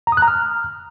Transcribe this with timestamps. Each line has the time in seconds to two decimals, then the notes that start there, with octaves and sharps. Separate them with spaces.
0.07 A#5
0.12 D#6
0.17 F#6
0.22 A#5
0.27 F6